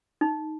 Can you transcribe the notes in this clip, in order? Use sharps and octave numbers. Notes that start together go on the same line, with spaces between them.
D#4